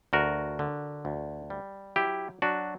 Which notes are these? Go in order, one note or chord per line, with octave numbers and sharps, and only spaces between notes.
D2 F#4 A#4
D3
D2
G3
F#3 E4 G4
F#3 D4 F#4